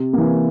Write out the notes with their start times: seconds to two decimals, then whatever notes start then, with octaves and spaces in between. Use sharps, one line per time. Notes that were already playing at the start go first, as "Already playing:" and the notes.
Already playing: C3
0.13 E3 A#3